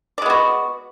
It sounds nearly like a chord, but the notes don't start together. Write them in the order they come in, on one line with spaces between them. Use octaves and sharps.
D5 G#3 B3 F#4